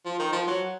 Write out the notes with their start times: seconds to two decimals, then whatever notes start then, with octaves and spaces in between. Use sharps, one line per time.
0.05 F3
0.19 D#3
0.32 F3
0.47 F#3